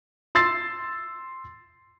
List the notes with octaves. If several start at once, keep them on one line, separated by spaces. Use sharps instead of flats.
C6 E6 A6 C7